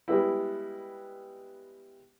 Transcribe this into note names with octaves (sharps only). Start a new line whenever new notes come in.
G3 G#3 B3 E4